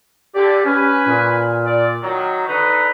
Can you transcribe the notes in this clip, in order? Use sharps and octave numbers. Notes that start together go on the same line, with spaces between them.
D3 G4 D5
C#4 B4 G#5
A#2
D5
D#3 F#3
D3 D#4 B4